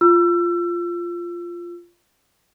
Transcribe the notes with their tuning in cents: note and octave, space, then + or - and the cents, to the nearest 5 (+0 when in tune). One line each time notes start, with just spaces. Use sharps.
F4 -5 E6 +30